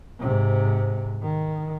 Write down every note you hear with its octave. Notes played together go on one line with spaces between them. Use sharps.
G#2 C3
D#3